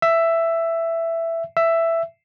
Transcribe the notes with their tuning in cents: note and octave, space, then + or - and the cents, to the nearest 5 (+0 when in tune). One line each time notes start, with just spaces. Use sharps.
E5 +10
E5 +10